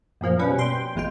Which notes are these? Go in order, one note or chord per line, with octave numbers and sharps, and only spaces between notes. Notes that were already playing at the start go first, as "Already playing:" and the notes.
F#2 A#2 F3 A#3
B2 G3 C#4 B4
G5 C6
G#1 E2 G#3 F4 G5